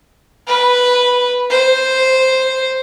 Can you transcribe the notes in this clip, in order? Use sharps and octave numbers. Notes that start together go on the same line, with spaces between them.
B4
C5